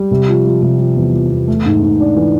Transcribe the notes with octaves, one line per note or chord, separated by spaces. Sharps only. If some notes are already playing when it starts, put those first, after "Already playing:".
Already playing: G3
C3
F3
F3
C3
F3
E2
F3
E2
A3
G#2
G#2
D4
E3